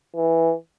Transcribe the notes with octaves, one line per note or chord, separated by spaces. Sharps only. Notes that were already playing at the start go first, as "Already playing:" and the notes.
E3